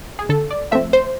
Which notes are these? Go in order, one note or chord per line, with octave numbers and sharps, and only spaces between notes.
G#4
D3 A4
D5
F3 A3 C4 E5
C5